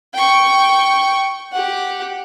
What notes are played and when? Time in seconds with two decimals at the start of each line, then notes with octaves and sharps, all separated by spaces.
0.14 G5 C#6
1.52 G4 F#5